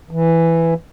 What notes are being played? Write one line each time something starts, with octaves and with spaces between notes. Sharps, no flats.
E3